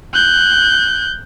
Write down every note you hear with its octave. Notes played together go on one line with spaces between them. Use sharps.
F#6 G6